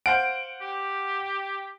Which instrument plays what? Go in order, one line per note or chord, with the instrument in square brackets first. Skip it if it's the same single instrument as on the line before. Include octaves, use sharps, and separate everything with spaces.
[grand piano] C5 F5 F#5 [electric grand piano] D7
[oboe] G4